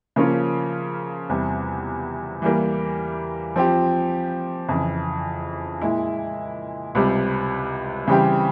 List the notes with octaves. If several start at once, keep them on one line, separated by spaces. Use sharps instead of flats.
C#3 F3 A#3 C#4 F4
E2 C3 G3
E3 G3 A#3
F3 C4 G4
F2 C#3 E3
A#2 G#3 E4
C#2 C3 G3
C#3 E3 G3 C4 G4